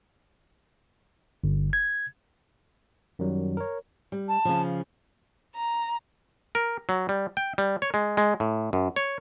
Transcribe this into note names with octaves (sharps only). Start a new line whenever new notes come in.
G1
G#6
F#2 D#3 F#3 G3
A#4 C#5
G3
A5
C#3 F3
A#5
A#4
F#3
G3
G5
G3
C#5
G#3
G#3
A2
F#2
C#5